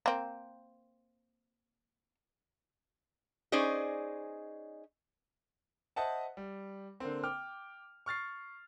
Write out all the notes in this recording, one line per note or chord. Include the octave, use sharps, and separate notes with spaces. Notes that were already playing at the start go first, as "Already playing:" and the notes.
A#3 C4
C#4 D#4 G#4 C5 D5 D#5
C5 D#5 E5 F#5 A5
G3
D3 A#3 C4
G5 D6 F6
C#6 F6 A6 C7